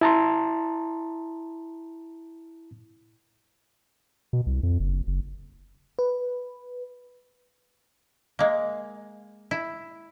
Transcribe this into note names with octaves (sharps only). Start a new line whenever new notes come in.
E4 A5 A#5 C6
B2
C2
F2
F#1
F#1
B4
G#3 A#3
E4